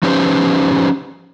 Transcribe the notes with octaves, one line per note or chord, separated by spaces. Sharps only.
F3 C#4 D#4 G4 B4 C5